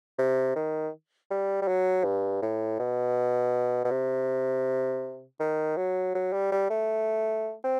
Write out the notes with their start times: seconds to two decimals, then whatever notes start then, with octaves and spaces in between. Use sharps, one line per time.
0.18 C3
0.56 D#3
1.31 G3
1.62 G3
1.68 F#3
2.04 G2
2.42 A2
2.79 B2
3.85 B2
3.91 C3
5.40 D#3
5.77 F#3
6.15 F#3
6.33 G3
6.52 G3
6.70 A3
7.64 C4